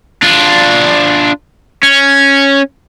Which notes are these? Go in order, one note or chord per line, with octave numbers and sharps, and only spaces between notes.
D4 F4
C#4